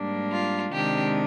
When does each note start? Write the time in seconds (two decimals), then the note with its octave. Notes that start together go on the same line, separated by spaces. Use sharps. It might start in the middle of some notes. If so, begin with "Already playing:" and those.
Already playing: G#2 G3 A#3 D4
0.31 F4
0.72 C3 D#3 G#3 D4 G4